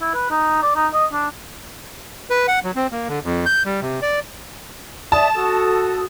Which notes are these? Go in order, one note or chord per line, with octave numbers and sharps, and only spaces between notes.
E4
B4
D#4
D5
D#4
D#5
D4
B4
F#5
F#3
C4
A#3
D3
F2
G6
G3
C3
D5
D5 E5 A5 D#6
F#4 A4 D#6